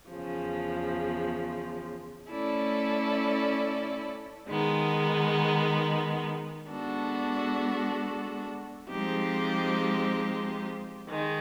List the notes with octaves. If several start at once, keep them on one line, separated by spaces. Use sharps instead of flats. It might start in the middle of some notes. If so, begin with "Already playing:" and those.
E2 C#3 F3
A3 C#4 E4 A4 D5
D#3 G#3 B3 D#4
G#3 B3 D4 F#4 A4
F3 G#3 C4 D#4 G4
D#3 G#3